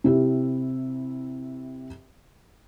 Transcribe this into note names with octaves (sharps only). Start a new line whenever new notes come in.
C3 E4 G4